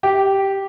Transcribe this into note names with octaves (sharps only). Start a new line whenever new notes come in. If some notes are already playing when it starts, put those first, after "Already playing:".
G4